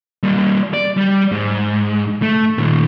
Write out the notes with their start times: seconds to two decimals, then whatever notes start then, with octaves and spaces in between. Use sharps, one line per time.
0.23 G3 A#3
0.74 D5
0.97 G3
1.32 G#2
2.22 A3
2.58 A#2 D#3